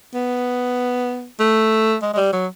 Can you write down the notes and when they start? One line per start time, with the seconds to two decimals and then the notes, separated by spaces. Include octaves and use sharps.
0.14 B3
1.40 A3
2.02 G#3
2.13 G#3
2.17 G3
2.33 F#3